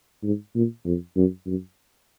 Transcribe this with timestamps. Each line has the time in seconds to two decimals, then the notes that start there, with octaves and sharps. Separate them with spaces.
0.24 G#2
0.56 A#2
0.86 F2
1.16 F#2
1.47 F#2